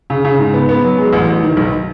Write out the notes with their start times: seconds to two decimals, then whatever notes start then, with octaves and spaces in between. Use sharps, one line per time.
0.10 C#3
0.25 C#3
0.39 G#2
0.54 B3
0.69 B3
0.84 F#3
0.98 G#3
1.13 A1
1.28 A1
1.43 D#3
1.57 B1